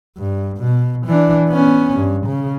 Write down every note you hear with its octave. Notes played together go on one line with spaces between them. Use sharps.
G2
B2
E3 D4
B3 C#4
G2
C#3